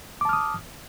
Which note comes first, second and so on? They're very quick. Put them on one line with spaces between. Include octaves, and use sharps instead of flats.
D6 A5 F6 D#6